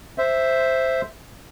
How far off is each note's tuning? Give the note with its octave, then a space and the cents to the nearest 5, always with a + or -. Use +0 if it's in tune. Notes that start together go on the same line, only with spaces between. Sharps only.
C5 +0 E5 +0